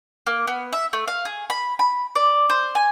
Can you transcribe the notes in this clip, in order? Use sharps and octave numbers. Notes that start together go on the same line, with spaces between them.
A#3
B3
E5
A3
F5
G#4
B5
B5
D5
C5
G#5